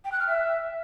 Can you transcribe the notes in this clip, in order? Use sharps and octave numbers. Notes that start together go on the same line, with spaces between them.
G5
F#6
F6
E5